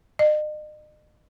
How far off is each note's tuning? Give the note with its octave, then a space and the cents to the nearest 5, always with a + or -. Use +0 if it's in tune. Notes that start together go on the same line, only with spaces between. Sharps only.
D#5 -40